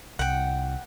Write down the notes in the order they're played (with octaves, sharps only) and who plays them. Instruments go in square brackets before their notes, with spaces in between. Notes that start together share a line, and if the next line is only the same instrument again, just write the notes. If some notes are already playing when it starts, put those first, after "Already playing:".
[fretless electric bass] C2 [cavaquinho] F#5 G5